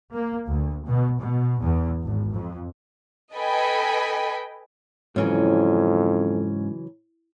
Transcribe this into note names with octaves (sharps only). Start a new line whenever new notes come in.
A#3
D2
B2
B2
E2
G#1
F2
A4 B4 D#5 G5 G#5 B5
F2 G#2 C#3 E3 F#3 C#4